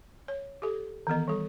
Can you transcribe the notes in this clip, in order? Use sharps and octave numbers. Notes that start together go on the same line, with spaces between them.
C#5
G4 A4
D#3 E3 B3 D#5
G3 A4